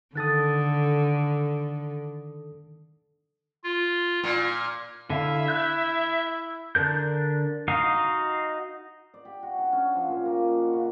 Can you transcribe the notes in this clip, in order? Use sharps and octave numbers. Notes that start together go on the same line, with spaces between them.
D3 D#3 A4 D#6 F#6 A6
F4
A#2 F6
D3 E4 E5 F5
F#6 G6
D3 D4 A#4 G6
D#4 F#4 D#5 F5
D5
G4
F#4
D4
C#4
F3
A#2
A#3
D#5
F#5
C#3